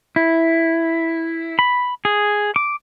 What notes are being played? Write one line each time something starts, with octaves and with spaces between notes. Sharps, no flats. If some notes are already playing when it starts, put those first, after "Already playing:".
E4
B5
G#4
D6